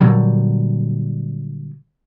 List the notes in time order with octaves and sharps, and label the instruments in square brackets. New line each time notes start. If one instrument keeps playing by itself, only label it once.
[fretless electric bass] A#2 D3 F#3 G3